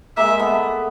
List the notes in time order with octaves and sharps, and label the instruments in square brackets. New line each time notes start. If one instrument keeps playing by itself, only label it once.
[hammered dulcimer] G#3 A#3 [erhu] E5
[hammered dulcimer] A3 B3